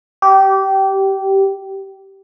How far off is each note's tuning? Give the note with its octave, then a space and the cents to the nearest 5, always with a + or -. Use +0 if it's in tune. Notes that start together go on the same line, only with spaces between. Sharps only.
G4 -20